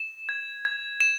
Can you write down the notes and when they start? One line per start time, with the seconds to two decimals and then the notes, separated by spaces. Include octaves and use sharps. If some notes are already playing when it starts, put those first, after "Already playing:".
Already playing: E7
0.29 G#6
0.65 G#6
1.00 E7